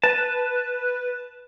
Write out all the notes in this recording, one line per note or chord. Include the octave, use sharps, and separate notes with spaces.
B4 A5